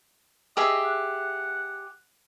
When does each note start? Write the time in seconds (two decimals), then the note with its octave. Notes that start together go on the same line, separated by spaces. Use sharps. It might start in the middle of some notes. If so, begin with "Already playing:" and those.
0.57 G4 G#4 D#5 E5
0.85 F#5